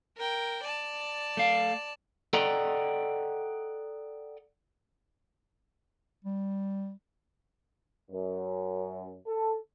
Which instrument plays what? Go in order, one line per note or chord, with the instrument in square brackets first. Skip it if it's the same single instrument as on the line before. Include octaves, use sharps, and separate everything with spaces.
[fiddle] A#4 G5
D5 A5
[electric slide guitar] A3 F5
[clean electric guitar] A4 D5 D#5 F#5 G5 A#5
[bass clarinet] G3
[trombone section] F#2
A4